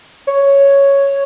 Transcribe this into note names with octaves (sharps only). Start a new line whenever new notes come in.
C#5